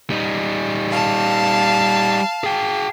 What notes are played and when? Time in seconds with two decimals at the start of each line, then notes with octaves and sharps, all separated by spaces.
0.10 G3 D#4
0.91 F5 A5
2.44 G#4 G5